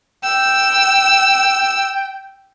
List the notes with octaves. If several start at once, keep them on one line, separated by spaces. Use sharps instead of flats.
G5 E6